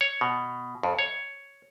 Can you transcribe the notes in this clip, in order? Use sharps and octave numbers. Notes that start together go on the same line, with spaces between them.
C#5
B2
F2
C#5